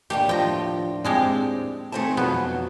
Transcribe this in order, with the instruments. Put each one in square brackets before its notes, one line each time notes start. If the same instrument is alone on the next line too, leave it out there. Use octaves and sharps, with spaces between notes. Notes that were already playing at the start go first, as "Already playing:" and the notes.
[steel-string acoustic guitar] D#2 A2 D4 [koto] G4
[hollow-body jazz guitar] F3 [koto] G5 A#5
[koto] F3 G#3 G4 [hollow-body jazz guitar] C4
[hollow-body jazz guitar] D#3 C4 A5 [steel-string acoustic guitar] A3 G#4 E5
[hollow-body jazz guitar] F2 F#3 [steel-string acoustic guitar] B2 [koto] B3